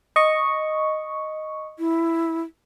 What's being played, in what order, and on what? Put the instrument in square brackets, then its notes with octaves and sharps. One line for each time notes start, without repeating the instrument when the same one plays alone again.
[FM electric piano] D#5 C#6
[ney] E4